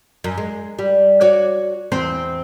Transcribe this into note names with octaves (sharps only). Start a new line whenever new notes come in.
F#2
G#3
G3
F#4 C#5 D5
E2 C4 C5